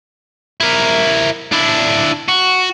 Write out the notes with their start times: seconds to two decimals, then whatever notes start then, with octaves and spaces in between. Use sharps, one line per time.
0.60 E4 A#4
1.52 D4 E4
2.28 F#4